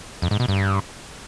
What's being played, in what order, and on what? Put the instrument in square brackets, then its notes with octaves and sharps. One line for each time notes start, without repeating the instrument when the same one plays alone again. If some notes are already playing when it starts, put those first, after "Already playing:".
[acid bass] F2
G#2
B2
G2